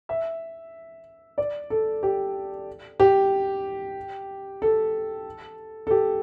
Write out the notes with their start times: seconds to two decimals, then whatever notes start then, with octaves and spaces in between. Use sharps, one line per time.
0.09 E5
1.38 D5
1.70 A4
2.03 G4
3.00 G4
4.62 A4
5.87 A4
5.91 G4